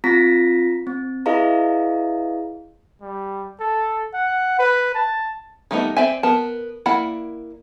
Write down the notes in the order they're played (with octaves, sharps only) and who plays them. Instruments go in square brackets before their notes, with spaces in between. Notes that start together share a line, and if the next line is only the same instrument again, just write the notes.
[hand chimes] C4 F4 A#5 A#6 B6
C4
E4 G#4 B4 D#5 F5 A#5
[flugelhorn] G3
A4
F#5
B4
A5
[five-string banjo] D#3 G3 A3 B3 D#4
C4 D5 E5 G#5
B3 A#4 A5
A#3 E4 D5 F#5 B5